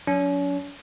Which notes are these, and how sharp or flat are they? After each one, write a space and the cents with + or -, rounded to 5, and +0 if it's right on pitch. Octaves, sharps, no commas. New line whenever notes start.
F#3 -35 C#4 +40